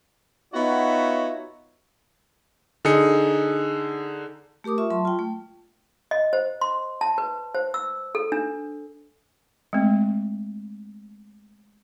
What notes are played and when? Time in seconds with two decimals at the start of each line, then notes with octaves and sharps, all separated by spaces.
0.54 B3 D#4 F4 F#4 C#5 E5
2.85 D3 D#4 G#4 C#7
4.64 A3 G4 A#4 D6 D#6
4.78 F4 E5 C#6
4.90 F#3 A5 C6
5.05 F4 G5
5.19 A3
6.11 D#5
6.33 C5
6.61 C6
7.01 A5
7.18 B4
7.55 C5
7.74 E6
8.15 A4
8.32 D4
9.73 G#3 A3 C4